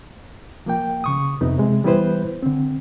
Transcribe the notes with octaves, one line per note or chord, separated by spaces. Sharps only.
F3 A#3 G5
C#3 C#6 D#6
F2 C3 B3 D#4
C3 G#3
E3 G3 B3 E4 B4 C5
D3 C4